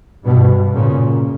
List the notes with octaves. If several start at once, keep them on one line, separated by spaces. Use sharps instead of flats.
G2 B2
A#2 C#3